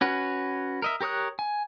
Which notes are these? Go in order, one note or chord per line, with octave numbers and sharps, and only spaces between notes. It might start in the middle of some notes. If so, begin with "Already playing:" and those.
C#4 F#4 B4
A#4 D#5 E5
G4 A#4 C#5 D#6 F#6
G#5